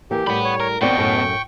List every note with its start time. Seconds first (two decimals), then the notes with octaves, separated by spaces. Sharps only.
0.11 E3 A#3 G4
0.27 A2 G3 F#5 B5
0.45 C#5
0.60 A#4
0.81 D#2 B2 C4 D5 G5 C#6
0.97 F#2 A2